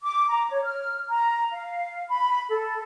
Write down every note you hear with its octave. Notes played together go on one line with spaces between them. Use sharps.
D6
A#5
C#5
F6
A#5
F5
B5
A4